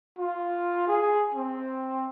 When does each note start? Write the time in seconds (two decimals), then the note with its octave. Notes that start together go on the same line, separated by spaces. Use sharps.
0.17 F4
0.87 G#4
1.34 C4